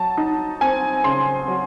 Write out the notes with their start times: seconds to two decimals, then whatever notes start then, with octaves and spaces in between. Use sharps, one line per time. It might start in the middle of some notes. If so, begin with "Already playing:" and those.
Already playing: F#3 A5
0.17 D#4
0.61 C4 G#5
1.04 C#3 C6
1.48 F#3